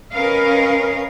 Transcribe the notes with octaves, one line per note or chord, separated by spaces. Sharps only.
C#4 A#4 B4 D#5 F5